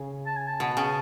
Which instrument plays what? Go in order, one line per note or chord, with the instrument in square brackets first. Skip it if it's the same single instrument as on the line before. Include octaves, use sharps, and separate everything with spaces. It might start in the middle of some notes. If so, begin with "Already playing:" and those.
Already playing: [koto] C#3
[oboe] A5
G#5
A5
[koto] B2
C#3